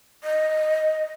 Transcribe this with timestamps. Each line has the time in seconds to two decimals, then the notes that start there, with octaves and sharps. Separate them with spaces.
0.24 D#5